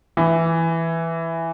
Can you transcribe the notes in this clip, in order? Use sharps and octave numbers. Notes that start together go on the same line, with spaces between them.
E3